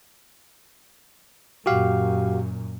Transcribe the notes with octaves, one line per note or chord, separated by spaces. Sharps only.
F#2 A#2 F#4 G4 F5